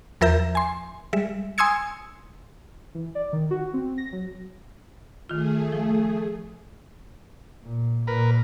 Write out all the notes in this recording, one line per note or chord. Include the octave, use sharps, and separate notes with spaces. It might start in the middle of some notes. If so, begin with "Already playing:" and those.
E2 F3 A#4 E5 A#5 G6
G#5 C6
G3 G#3 E5
G#5 C6 D#6 E6 G#6 C#7
E3
D5
D#3
F#4
C4
A#6
F#3
D#3 A3 F4 G#4
F3
A#2
A#2 A#4 B4